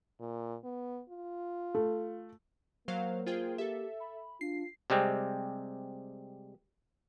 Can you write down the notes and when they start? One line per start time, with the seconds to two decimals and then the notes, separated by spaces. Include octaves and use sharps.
0.19 A#2
0.64 B3
1.09 F4
1.75 A3
2.88 F#3 A#3 C5 F5
3.27 F4 G#4 C5 G5
3.58 G4 A4 E5
4.00 B5
4.41 D4 F4 C7
4.90 C3 G3 G#3 C4